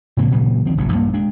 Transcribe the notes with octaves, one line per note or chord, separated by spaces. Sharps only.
G#2 C3 E3 A#3
A#2 C#3 E3 F#3
D#3 F3 C4
F1 A#1 G2 C3
A#1 G2 F3 A#3
G#3 D4